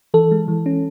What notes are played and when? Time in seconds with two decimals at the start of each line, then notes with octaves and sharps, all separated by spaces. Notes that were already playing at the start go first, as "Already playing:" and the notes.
0.14 E3 A4
0.31 G#3
0.48 E3
0.66 C#4